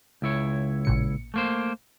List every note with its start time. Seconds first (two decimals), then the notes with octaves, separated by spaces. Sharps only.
0.22 C#2 E4 C#5
0.85 A1 A#2 C#7
1.34 A3 A#3 C5